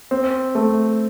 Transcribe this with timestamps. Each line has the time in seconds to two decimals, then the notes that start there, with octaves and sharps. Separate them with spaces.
0.11 C4
0.55 A3